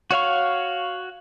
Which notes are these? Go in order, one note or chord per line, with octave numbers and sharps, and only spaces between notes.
F#4 C#5 F5 C#6